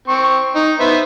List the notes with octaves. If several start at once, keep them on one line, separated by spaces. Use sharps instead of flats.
C4 C#6
D#4
B3 C5 E5